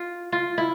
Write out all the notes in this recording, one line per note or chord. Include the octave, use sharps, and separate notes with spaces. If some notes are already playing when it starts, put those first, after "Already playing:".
Already playing: F4
F4
E4